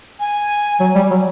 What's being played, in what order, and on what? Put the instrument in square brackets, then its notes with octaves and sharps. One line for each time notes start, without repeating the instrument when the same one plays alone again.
[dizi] G#5
[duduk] F#3
G3
F#3